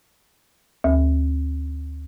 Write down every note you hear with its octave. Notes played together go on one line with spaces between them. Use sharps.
D2